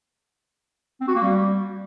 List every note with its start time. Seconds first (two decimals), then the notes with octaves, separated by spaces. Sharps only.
1.01 C4
1.08 F#4
1.15 A#3
1.22 G3